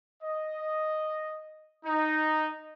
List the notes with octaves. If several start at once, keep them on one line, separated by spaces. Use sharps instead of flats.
D#5
D#4